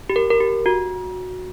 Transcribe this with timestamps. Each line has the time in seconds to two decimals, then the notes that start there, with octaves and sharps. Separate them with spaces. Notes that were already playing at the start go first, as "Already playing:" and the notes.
0.09 G4
0.16 A#4
0.30 A#4
0.40 G4
0.66 F#4